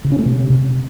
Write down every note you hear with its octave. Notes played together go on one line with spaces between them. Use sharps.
C#3
C#4
A3
C3